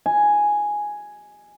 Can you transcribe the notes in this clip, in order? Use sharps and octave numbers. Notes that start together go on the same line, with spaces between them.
G#5